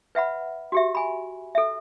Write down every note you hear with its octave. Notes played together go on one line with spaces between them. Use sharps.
B4 E5 F#5 B5
F#4 G4 E5
G#5 B5
A4 E5